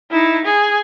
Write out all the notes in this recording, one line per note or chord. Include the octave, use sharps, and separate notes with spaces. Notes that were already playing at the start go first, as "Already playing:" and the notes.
D#4 E4
G#4